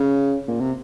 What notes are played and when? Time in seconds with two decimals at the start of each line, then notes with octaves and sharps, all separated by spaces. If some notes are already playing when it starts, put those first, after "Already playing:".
Already playing: C#3
0.47 A#2
0.60 C3